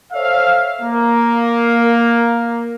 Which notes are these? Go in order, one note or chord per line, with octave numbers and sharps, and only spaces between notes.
A4 C5 C#5 E5 F5
A#3